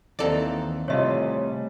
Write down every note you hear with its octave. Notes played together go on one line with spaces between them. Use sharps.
D#2 D#3 E3 C4 A4 D5 A#5
A2 C3 G3 A3 F4 G#4 C#5 D#5